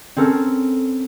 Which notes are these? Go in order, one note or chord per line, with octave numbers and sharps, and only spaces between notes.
C4 C#4 A4 A#4